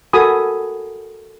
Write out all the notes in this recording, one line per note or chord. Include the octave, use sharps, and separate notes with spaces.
F#4 A4 A#4 G#5 B5 D#6